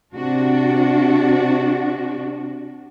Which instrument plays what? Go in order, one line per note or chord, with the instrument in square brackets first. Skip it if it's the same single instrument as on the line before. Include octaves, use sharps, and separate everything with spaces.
[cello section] C3 D4 F#4